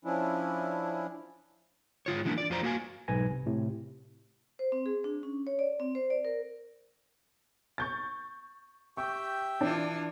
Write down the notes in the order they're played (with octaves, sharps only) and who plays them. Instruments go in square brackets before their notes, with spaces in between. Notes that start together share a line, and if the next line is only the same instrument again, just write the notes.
[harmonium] F3 C#4 D4 E4
[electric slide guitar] G#2 F4 C#5
E3 F#3 A#3 B3 D4 E4
D5
F2 F4 C5 A#5
A#3 F#4 F5 G#5
[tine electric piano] B1 G#2 B4 G#5 A#6
C3
A2 C3
[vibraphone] C5
C4
G#4
D4
C#4
C#5
D5
C4
C5
D5
A#4
[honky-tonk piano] C#6 G6 A6
[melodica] G4 E5 G5 [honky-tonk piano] C#6
[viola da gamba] E3 E4 F4 [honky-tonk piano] D4